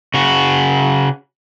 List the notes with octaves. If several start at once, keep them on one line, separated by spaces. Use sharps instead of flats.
C#3 F#4